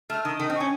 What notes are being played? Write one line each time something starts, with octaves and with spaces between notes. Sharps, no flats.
A3 F6
D#3 D#6
D#3 D#6
C4
C#6
C#4